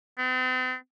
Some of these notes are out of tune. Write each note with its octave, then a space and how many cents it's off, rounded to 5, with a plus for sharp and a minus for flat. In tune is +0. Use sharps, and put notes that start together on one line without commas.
C4 -45